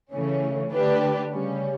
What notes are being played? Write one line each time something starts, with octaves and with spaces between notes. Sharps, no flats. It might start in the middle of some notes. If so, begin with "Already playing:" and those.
C#3 E3 A3 C#4
D3 A3 D4 G4 B4
C#3 G3 C#4